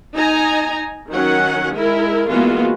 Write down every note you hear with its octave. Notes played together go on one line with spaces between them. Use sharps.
D#4 D#5 G#5 A#5
D#3 F#3 C#4 F#5
G#3 E4 A#4
E3 G#3 A#3 B3 F4 F#4